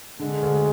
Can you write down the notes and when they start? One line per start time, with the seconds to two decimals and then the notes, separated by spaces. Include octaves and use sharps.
0.19 D3 G#3
0.42 D2